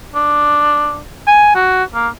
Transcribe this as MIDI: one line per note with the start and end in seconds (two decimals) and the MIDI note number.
0.15 1.00 62
1.27 1.54 80
1.55 1.84 66
1.94 2.08 58